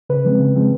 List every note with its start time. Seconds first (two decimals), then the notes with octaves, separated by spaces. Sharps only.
0.10 C#3 B4
0.25 F3 G#3 C4
0.40 C#3
0.56 F3 G#3 C4